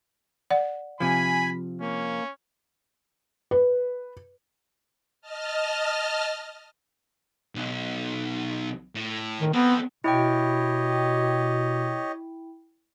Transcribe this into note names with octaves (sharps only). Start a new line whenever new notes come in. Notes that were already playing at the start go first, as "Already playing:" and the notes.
D5 F#5
C3 F3 G#5 B5
A#3 C#4
B4
D#5 A5 F6
B1
A2
D#3
B3 C4 A4
B2 E4 G4 C#5 D#5 G5